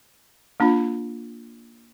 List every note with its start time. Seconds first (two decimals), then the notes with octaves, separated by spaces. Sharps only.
0.60 A#3 D4 F4